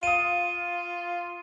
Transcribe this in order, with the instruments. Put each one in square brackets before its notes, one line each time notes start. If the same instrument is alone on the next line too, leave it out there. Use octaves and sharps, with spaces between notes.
[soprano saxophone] F4 [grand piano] F5 D#6 [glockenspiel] D#7